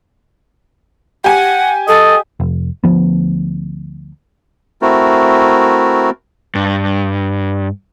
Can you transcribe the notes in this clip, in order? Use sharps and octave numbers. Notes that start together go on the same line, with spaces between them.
G4 F#5 G#5
A4 D#5
F1
D2 F3 B3
A3 C4 E4 F#4 A#4
G2